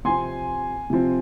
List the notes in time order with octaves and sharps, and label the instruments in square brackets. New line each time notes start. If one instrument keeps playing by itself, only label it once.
[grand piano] C3 F3 C4 [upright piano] G#5 C6
[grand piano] C3 F3 C4